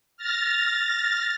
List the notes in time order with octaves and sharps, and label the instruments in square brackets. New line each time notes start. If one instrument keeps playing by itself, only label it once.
[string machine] F6 A6 A#6